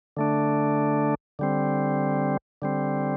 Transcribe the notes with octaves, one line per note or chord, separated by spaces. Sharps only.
D3 A3 D4
D3 G3 C4
D3 G3 C4